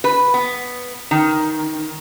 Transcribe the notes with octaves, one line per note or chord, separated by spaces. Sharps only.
B4
B3
D#3